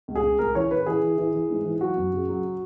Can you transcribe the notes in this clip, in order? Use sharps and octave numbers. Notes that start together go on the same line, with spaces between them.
C#2
G#4
C#2
C#2 A#4
E3 C#5
C#3 B4
E3 G#4
E3
E3
E3
G#2
E3
F#3 F#4
F#2
C#3
F#3